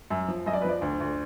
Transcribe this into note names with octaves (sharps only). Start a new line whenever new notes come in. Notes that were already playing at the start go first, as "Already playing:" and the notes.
F#2
F3
F#2 D#5
D5
B4
F3 D5
D2
D2